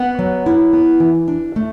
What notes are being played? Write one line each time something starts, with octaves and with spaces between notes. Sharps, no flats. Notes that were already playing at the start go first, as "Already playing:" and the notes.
Already playing: B3 F#5
F#3
E4
B3
E3
D4
A3